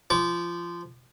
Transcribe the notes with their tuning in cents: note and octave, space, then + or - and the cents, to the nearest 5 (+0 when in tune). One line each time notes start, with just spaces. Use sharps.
F3 -20 D6 -40